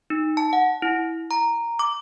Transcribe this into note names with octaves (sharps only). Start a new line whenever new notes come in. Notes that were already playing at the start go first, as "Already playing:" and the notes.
D#4
A5
F#5
E4
A#5
D6